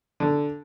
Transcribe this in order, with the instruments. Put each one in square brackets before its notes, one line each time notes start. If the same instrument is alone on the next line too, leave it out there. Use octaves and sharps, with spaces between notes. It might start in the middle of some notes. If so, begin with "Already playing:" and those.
[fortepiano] D3